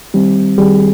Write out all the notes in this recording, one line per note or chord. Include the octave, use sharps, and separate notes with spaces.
D#3 G3 C4
D#3 G3 C4 G#4